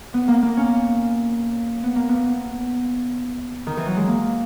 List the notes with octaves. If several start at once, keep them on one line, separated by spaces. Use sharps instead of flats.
B3
A#3
A#3
C#4
B3
A#3
B3
D#3
E3
F#3
G#3
A#3